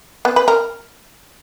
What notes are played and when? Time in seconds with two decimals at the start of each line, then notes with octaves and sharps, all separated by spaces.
0.25 B3
0.36 B4
0.48 A#4